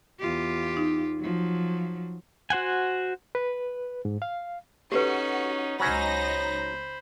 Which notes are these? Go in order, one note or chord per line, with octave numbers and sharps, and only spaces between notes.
E2 F4 G4
D#4
F3 F#3
F#4 C5 F#5 G#5
B4
G#2
F5
C#4 D#4 F#4 G4 A4 B4
C#2 F#3 C#4 D#4 C5 B5 A#6